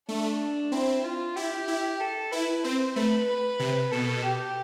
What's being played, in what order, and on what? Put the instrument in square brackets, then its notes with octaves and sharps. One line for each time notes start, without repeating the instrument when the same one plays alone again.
[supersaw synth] A3 [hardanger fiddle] D4
[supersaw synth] C4 [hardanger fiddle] E4
[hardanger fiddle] F4
[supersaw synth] E4 [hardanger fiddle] G4
[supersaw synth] E4
[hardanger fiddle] A4
[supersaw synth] E4 [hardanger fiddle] B4
[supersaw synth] C4 [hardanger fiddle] C5
[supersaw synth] A3 [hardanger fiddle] B4
[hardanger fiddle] B4
[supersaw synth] C3
[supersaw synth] B2 [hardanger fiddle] A4
[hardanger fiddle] G4